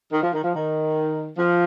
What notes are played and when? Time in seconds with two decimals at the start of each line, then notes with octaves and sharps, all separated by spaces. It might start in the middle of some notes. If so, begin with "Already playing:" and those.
0.13 D#3
0.23 F3
0.33 D#3
0.44 F3
0.55 D#3
1.38 F3